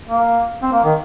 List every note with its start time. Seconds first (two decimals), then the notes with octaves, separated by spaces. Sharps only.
0.09 A#3
0.62 C4
0.73 A#3
0.84 D#3